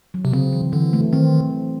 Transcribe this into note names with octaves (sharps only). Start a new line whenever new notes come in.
F#3
C3
C#3 C4
E3
D3 E3
A3
D#3 C4